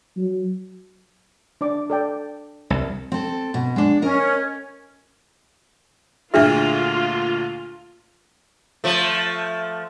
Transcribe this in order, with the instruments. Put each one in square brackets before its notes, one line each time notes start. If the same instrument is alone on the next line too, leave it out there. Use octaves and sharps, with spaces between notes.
[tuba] F#3
[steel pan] D4 D5 D6
A4 D5 G5
[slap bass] C2
[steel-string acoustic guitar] C4 A4
B2
G#3 D4
[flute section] C#4 [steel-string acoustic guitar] A#4 D#5
[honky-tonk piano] D2 A#2 F6 [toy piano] D4 G#4 E5 [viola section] F4
[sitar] F3 A3